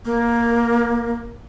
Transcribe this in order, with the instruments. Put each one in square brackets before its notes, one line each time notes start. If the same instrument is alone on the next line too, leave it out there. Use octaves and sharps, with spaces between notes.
[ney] A#3